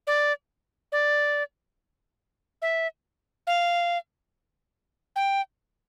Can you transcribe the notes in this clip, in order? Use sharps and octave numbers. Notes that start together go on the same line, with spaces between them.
D5
D5
E5
F5
G5